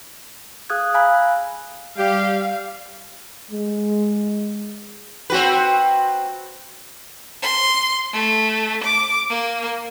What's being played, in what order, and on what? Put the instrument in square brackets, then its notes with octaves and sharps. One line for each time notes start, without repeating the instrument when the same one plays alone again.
[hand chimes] G#4 F5 D#6 F6 F#6 G#6
F5 G#5 A#5 B5 E6 F#6
[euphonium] G3 [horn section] G4 [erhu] F5
[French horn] G#3
[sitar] C4 F#4 B4
[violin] C6
A3
D6
A#3